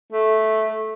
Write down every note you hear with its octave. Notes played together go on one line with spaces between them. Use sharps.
A3